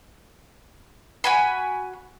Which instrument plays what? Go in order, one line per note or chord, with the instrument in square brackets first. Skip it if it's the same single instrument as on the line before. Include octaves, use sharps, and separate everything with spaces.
[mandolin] F#4 G#5 B5